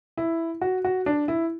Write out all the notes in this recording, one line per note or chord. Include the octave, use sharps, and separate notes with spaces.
E4
F#4
F#4
D4
E4